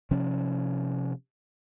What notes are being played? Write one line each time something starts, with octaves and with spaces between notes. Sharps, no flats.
C3 F3 C#4